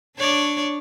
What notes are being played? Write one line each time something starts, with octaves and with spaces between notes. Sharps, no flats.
D4 C#5 D5